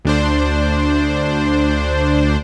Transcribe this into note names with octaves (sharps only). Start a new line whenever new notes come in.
D2 D4 C5